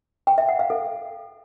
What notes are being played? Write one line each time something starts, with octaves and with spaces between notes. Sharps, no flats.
G5
E5
F#5
F5
A4